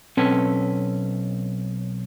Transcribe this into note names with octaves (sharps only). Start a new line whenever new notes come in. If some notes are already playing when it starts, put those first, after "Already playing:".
B1 C4 C#4 A4 B4 C#5